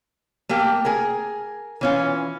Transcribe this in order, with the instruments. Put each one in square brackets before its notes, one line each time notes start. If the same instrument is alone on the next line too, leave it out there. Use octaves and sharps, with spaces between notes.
[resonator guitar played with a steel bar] A3 A#3 G4 G5
G#4 A#4
E3 C#4 F4